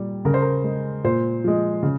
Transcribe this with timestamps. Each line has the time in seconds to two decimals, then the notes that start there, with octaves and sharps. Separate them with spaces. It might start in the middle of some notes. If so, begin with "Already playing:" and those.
Already playing: A#2 G3
0.25 C#3 A#4
0.34 C5
0.42 A#4
0.64 G#3
1.04 A#2 C5
1.44 F3 G#3
1.83 C#3